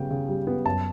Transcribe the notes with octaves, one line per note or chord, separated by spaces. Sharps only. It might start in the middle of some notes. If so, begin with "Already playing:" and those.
Already playing: C#3 G3 B3 G5
C#3
G3
B3
F#2 A5